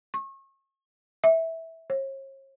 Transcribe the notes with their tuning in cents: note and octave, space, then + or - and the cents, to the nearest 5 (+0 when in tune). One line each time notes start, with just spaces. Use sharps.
C#6 -35
E5 -15
C#5 -45